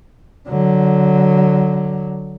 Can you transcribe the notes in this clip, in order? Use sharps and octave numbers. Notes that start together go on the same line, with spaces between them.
D3 F#3